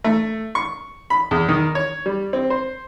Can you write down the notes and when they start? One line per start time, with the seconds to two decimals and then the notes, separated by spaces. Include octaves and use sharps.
0.04 A3
0.55 C#6
1.10 B5
1.31 E2
1.49 D#3
1.75 C#5
2.06 G3
2.33 C4
2.50 C5